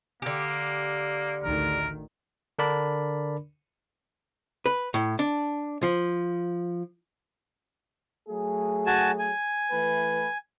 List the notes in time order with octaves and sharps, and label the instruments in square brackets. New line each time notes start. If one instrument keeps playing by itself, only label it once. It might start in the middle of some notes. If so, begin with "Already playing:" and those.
[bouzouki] D3 G4 [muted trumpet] A#3
[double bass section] A1 D2 D#3 [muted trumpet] A#4
[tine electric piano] D3 D4 A#4 D5 B5
[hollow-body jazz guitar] B4
A2
D4
F3
[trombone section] F#3 A3 G#4
[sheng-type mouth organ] F#4 G#5 A5
G#5
[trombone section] E3 A3 B4